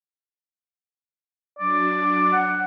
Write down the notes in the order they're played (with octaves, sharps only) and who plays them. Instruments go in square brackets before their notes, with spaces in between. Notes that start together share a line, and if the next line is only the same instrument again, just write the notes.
[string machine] F#3 D4 [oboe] D5
[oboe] F#5